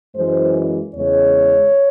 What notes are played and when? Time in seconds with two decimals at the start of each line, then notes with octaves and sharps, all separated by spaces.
0.14 F#2 E3 G#3 C5
0.94 E2 C#3 G#3 C#5